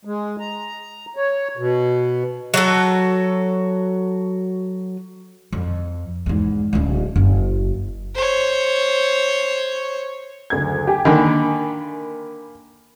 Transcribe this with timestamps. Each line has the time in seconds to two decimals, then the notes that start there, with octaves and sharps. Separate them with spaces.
0.05 G#3
0.40 A#5
1.16 C#5
1.57 B2
2.54 F#3 F#4 A4
5.53 F2
6.26 E2 G#2
6.73 D1 C#3
7.16 F#1
8.15 C5 C#5
10.50 F#1 D2 G#6
10.87 G4 G5 G#5
11.05 D3 D#3 A#3 G#5 B5